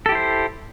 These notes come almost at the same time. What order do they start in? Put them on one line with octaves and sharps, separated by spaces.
A4 G4 E4 C5